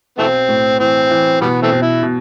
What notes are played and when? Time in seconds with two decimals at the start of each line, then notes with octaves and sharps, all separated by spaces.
0.18 B1 E3 A3 C4
0.49 A2
0.80 E3 C4
1.11 E3
1.41 B2 G3 B3
1.62 E3 A3 C4
1.72 B2
1.82 E4
2.03 B2